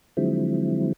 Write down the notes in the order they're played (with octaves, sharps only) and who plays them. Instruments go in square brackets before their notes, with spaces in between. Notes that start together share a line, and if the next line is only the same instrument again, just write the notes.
[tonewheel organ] D3 F3 F#3 G#3 C4 E4